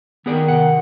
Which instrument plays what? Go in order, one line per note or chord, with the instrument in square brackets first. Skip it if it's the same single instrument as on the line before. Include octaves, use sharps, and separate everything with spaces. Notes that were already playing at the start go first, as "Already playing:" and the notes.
[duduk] D#3 [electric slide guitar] B3 G#4 D5
[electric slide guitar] C3 F#5